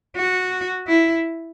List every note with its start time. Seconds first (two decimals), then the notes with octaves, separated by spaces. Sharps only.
0.16 F#4
0.87 E4